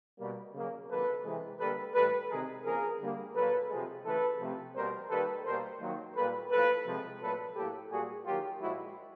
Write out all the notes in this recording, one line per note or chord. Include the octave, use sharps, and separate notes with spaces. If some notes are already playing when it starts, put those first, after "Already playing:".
B2 G3 A#3
C#3 F#3 A#3
C3 D#3 F#3 A#3 A4 B4
C3 E3 G#3
D3 G3 A#3 A4 B4
A2 E3 G3 A4 B4
C3 D#3 G#3 G#4 A#4
C#3 F3 A#3 G#4 A#4
D3 G3 A#3
A#2 F#3 A#3 A4 B4
C3 F3 G#3
C#3 E3 A3 A4 B4
C3 F3 A3
B2 G3 A#3 A#4 C5
D#3 G3 A#3 A4 B4
B2 G3 A#3 A#4 C5
D#3 F#3 A#3
A#2 G3 A#3 A4 B4
A2 F3 A#3 A4 B4
C3 F3 G#3
A#2 F#3 A3 A4 B4
A2 F#3 A#3 G4 A4
A#2 G3 A#3 F#4 G#4
D#3 F#3 A#3 F4 G4
A#2 F3 G#3 E4 F#4